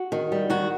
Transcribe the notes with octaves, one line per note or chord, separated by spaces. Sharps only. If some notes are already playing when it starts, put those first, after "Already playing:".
Already playing: F#4
D#3
G3
D#3 F#4